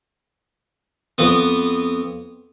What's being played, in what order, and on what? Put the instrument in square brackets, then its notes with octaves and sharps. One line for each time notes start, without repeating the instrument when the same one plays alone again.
[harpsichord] F2 B3